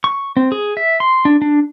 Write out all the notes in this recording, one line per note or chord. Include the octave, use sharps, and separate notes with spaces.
C#6
C4
G#4
E5
C6
D4
D4